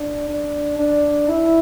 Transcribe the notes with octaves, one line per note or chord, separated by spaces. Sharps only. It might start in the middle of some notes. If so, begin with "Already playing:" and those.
Already playing: D4
D4
D4
E4